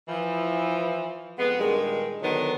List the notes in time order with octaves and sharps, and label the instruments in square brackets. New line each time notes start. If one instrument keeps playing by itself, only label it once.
[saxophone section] E3 F3
F2 G#3 B3
G2 A#2 D#3 G#3
D3 D#3 F#3 G#3 B3